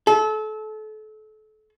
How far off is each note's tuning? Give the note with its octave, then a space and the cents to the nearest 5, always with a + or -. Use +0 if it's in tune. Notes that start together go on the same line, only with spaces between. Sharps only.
A4 -30